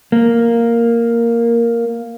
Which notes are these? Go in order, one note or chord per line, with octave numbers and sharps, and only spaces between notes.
A#3